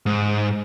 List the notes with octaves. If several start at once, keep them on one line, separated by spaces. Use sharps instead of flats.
G#2